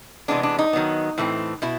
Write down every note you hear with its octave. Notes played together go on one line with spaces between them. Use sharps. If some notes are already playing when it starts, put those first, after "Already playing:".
C3 E3 G#3 B3 D4
D4
D#4
D#3 F#3 B3
A2 E3 A3 C4
B2 E4